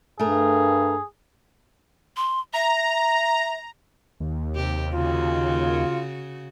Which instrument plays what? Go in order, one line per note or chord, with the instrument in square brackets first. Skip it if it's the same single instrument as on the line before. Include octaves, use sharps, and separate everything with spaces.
[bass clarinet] G2 [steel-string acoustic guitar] A3 A#4 [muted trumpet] G#4
[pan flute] C6
[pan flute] E5 [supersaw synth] A#5
[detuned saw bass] D#2
[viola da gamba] C3 G4
[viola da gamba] C#3 F#4 [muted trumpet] F4